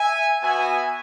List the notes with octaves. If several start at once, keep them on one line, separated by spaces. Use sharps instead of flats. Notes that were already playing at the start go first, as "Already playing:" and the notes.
Already playing: E5 G#5
B3 F#4 E5 G#5